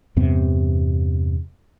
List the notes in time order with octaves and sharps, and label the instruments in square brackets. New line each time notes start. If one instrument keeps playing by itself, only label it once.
[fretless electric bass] E2 G2 C3 B3